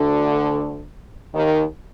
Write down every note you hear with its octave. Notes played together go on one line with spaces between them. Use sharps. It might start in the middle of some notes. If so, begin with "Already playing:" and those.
Already playing: D2 D3
D#2 D#3